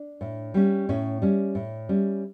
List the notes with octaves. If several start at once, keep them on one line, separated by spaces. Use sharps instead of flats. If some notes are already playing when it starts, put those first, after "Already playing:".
Already playing: D4
A2
G3 C#4
A2 C#4
G3 C#4
A2
G3 C#4